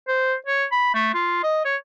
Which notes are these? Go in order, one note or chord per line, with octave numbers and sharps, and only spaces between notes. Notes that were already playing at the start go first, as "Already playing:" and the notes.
C5
C#5
B5
A3
F4
D#5
C#5